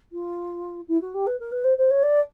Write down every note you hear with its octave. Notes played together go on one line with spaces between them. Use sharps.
F4
E4
F#4
G4
B4
A#4
B4
C5
C5
C#5
D5